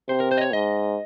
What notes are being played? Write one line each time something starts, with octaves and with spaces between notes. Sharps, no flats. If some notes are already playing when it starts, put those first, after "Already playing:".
C3 C5
A#4
C5
D#5
C#5
G#2 D#5